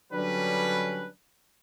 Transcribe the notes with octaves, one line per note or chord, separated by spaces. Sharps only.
D3 F#3 G3 C#4 D4 B4